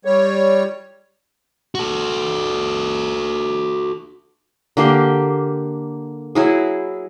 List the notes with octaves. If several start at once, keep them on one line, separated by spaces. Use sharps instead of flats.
G3 C#5
F#4 A4
D3 A#3 G4 C6
F#3 E4 G#4